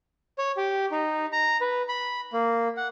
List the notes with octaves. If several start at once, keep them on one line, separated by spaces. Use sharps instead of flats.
C#5
G4
D#4
A#5
B4
B5
A#3
F#5